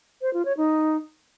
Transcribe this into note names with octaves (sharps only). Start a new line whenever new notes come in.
C5
F4
C#5
D#4